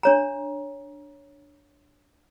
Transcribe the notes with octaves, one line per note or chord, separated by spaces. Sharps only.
D4 C#5 A#5